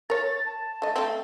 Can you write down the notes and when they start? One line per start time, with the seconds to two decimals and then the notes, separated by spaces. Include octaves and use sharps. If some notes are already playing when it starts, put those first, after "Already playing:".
0.10 A#4 C#5 A6
0.46 A5
0.82 A3 D#5
0.96 A3 C4